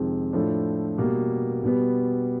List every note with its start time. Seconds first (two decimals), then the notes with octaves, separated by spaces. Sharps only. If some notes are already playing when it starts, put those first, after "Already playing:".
Already playing: F2 C3 D#3 G#3
0.33 A2 F3 A3 D4
0.98 B2 G3 A#3
1.63 B2 G3 B3